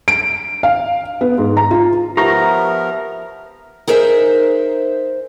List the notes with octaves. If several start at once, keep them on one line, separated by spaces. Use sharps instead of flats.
D7
F5
B3
G#2
A#5
F4
F3 B3 G4 A#4 E5 A#5 C#6
D#4 G#4 A#4 C5 E5